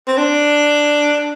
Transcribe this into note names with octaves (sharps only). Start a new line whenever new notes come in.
C4
D4